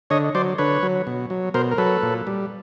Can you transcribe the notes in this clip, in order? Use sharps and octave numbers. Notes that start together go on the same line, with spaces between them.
D3 C#5 D#5
F#3 C5 D5
D3 B4 C#5
F#3
B2
F#3
B2 A#4 C5
A#4
F#3 A4 B4
A#2
G3